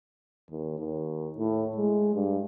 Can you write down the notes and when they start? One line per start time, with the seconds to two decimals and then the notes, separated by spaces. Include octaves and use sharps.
0.50 D#2
0.79 D#2
1.38 A2
1.76 G#3
2.15 G2